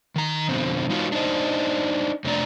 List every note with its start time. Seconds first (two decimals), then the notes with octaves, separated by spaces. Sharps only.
0.16 D#3 A#5
0.49 F2 B2 D3 C4
0.90 G#3 D#4 F4 F#4 B4 C#5
1.12 D4 D#4 C5 D#5
2.24 F2 C3 A3 D4 D5 A#5